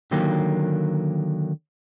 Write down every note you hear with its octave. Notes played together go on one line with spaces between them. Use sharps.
D3 D#3 F#3 A#3 G4